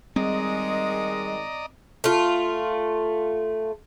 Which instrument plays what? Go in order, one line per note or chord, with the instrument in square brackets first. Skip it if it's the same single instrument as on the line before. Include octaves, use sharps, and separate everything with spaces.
[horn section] D#3 G#3 [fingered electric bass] G3 [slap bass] C4 [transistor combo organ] D5 D#5 A#5
[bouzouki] A3 F4